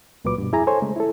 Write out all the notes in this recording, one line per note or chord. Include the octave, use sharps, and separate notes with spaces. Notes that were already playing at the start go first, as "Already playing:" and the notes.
C#2 A#2 F#3 B4 D6
G2 B2
F2 E4 G#4 G#5 A#5
A4 C5 C#5 G#5 C6
C#3 G#3 A3
E4 A4